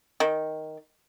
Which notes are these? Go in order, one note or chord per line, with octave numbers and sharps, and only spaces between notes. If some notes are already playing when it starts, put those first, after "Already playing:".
D#3